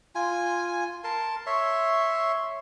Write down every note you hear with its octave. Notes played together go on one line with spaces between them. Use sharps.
F4 G#5
A#4 A5 C6
C#5 E5 C6